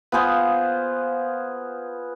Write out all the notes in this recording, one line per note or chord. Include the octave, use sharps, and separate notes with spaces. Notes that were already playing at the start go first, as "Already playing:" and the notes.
B3 F4 G#4 C5